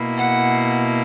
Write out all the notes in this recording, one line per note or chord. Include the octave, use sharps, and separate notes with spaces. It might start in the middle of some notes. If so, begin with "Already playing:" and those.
Already playing: B2 A#3 E4
F#5